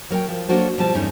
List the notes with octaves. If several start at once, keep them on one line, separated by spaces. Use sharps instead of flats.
F#3 A#4 F5 G5
F3
F#3 A#3 D4 F#4 A4 C5
B2 F3 G3 A5
E2 G2 A3 C#4 D#4